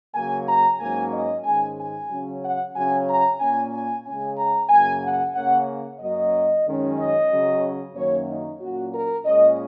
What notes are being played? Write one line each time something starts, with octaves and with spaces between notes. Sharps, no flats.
C#3 F#3 A#3 G#5
A#5
G#2 F#3 A#3 C#4 G#5
D#5
G#2 D#3 G#3 C#4 G#5
G#5
C#3 F#3 C#4
F#5
C#3 F#3 C#4 G#5
A#5
A#2 A#3 C#4 G#5
G#5
C#3 G#3 C#4 G#5
A#5
F#2 C#3 A#3 G#5
F#5
C#3 A#3 C#4 F#5
F#2 F#3 A#3 C#4 D#5
F#2 D#3 G#3 C#4
D#5
C#3 F#3 C#4
F#2 D#3 F#3 A#3 C#4 C#5
D#4
A#2 F#3 A#3 C#4 F#4
A#4
A#2 G#3 C#4 D#5